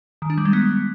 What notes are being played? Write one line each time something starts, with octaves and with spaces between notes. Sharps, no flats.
D#3
D4
G3
G#3
B3